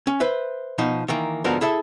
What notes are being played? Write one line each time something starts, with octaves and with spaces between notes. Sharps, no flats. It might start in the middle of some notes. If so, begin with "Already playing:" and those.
C#4
B4 C5 E5
B2 F3 D#4
D#3 E3 A#3
G#2 D3 F3 B3 F#4 A#4
E4 G#4 A4 E5